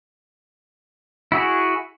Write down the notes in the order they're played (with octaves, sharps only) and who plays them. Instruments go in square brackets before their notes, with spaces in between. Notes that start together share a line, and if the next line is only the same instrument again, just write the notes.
[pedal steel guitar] E4 F#4 G#4